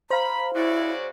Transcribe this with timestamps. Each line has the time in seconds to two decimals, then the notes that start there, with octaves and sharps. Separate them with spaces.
0.10 C5 F5 A#5 B5
0.54 C#3 E4 F#4 D5